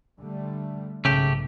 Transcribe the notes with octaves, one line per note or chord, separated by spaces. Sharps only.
D3 G3 A3
B1 G#2 C#3 A3 G4